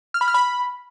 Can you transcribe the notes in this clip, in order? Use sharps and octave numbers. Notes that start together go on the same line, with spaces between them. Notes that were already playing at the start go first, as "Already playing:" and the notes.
F6
B5
F6
B5